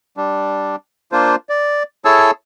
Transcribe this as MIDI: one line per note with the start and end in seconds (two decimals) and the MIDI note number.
0.17 0.76 55
0.17 0.76 62
1.12 1.36 58
1.12 1.36 62
1.12 1.36 65
1.12 1.36 72
1.49 1.83 74
2.05 2.31 64
2.05 2.31 68
2.05 2.31 69
2.05 2.31 73
2.05 2.31 81
2.05 2.31 88